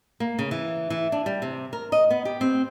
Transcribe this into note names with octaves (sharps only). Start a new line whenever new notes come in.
A#3
C#3
E3
E3
D4
G3
C3
A#4
D#5
B3
G4
C4